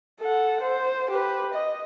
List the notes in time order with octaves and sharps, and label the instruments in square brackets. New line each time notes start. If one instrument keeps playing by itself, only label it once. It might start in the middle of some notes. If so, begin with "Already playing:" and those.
[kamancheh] A4 F#5
C5
G4 B4
D#5